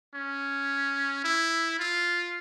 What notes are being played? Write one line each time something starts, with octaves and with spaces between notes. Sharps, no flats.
C#4
E4
F4